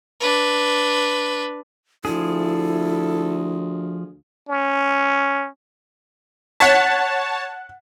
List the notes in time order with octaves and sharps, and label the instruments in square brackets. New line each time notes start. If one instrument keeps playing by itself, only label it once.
[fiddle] D4 B4
[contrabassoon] D2 [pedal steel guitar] F3 G#4 [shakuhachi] E4 [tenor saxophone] A4
[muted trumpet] C#4
[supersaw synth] C#5 A5 [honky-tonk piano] F#5 B6